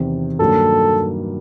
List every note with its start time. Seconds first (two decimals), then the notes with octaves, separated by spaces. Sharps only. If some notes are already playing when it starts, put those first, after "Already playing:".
Already playing: E2 C3 D#3
0.39 G2 D#3 F#3 A#3 A4